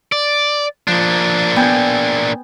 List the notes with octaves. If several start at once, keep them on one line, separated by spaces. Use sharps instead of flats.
D5
F3 A#3 D4
B3 G5 G#5